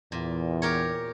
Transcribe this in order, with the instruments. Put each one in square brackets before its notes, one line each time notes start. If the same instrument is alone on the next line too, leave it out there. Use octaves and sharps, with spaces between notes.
[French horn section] E2 [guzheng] A#2
[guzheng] G4 A#4 C#5